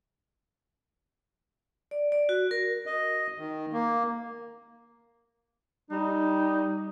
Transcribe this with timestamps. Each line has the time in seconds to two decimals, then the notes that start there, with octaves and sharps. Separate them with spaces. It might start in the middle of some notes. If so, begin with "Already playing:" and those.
1.91 D5
2.12 D5
2.29 F#4
2.51 A#4
2.86 D#5
3.38 D#3
3.73 A#3
5.90 G3 D#4